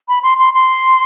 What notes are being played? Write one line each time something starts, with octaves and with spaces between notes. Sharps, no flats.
B5
C6
C6
C6